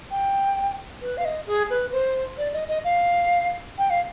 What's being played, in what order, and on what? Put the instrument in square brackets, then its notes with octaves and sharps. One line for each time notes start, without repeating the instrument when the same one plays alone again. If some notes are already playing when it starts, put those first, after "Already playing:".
[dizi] G5
B4
F5
D#5
G#4
B4
C5
D5
D#5
D#5
F5
G5
F5